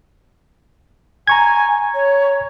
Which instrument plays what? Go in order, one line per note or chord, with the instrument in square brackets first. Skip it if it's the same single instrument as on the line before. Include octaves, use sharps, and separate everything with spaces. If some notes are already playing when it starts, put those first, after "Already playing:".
[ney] G#5 [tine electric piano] A#5 C#6 G#6
[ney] C#5